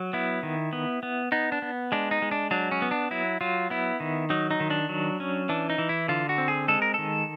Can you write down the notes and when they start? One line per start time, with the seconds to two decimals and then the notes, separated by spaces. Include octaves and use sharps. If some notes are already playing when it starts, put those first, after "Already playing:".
Already playing: F#3
0.13 B3 E4
0.43 D#3
0.73 B3
1.03 B3
1.32 B3 D#4
1.52 D4
1.62 B3
1.92 G#3 D4
2.11 D#4
2.22 G#3
2.31 D4
2.51 F#3 D4
2.72 C#4
2.82 B3
2.91 D4
3.11 F#3 E4
3.41 F#3 F4
3.70 B3 E4
4.00 D#3
4.30 F#3 D#4
4.51 D#4
4.60 D#3
4.70 D4
4.89 F#3
5.20 C#4
5.49 E3 D4
5.70 D#4
5.78 E3
5.89 E4
6.08 D3 F4
6.29 F#4
6.38 C4
6.48 G#4
6.68 G#3 A4
6.82 A#4
6.94 D#3 A4